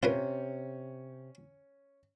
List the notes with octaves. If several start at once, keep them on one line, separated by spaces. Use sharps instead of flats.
C3 C#4 F4 A#4 B4